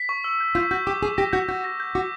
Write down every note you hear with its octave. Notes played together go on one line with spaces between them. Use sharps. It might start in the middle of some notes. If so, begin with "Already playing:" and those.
Already playing: B6
C#6
E6
G6
F4 G6
F#4 G6
G4 D6
G#4 D6
G4 A#6
F#4 G6
F#4 G6
A#6
G6
F#4 D6